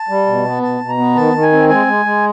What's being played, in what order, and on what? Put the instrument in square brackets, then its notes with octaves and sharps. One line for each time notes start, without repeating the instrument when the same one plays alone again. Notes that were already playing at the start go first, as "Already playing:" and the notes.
Already playing: [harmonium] A5
G3
B2
B3
B2 A5
B2
A#5
B3
D#3 A5
D#3
G#5
C4
G#3 G#5
G#3
G#3